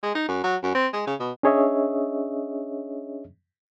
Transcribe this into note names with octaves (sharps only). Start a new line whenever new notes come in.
G#3
D#4
F#2
F#3
F#2
C4
G#3
C#3
B2
C#4 D4 G#4 C#5 D#5 E5